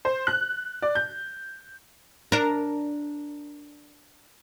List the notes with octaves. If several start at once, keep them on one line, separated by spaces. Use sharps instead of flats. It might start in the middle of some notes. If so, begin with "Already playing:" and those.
C5
F#6
D5
G6
D4 A#4